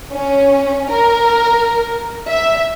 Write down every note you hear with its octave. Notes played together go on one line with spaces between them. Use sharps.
C#4
A#4
E5